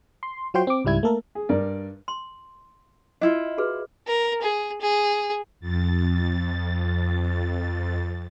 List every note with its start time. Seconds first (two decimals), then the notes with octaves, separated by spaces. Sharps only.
0.23 C6
0.54 F#3 F4 F#4 C5 G5 C6
0.67 C4 D6
0.85 C#2 G#2 G3 E4 G#6
1.03 A3 A#3 A4 A#4
1.35 G#4
1.49 G2 A#4 D5
2.08 C6
3.21 D4 E4 F4 D#5
3.58 F#4 G#4 B4
4.07 A#4
4.42 G#4
4.81 G#4
5.60 F2 A6